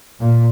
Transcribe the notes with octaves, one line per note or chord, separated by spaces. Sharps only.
A#2